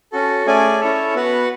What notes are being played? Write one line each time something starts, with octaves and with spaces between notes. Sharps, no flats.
C#4 F#4 A4
A3 C#4 G#4 D5 G#5
C#4 E4 A4 C#5 E5
B3 F#4 B4 F#5